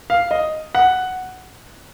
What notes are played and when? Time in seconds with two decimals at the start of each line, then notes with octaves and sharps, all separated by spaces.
0.10 F5
0.31 D#5
0.75 F#5